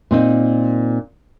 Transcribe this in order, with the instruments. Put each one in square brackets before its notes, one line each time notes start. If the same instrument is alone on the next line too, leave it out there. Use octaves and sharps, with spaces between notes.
[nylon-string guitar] A#2 C4 D#4